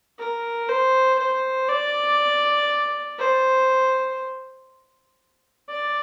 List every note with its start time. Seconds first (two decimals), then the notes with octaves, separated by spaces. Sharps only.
0.19 A#4
0.69 C5
1.19 C5
1.68 D5
3.19 C5
5.69 D5